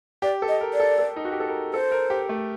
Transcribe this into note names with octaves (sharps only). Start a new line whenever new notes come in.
G4 D5
A4
D#5
A#4
D5
A4
A4
D#4
F#4
G4
A4
A#4
A4 C5
A#4
G4
A3